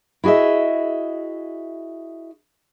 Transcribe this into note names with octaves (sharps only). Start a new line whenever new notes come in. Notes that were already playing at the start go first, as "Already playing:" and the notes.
E4 F#4 G#4 D#5 E5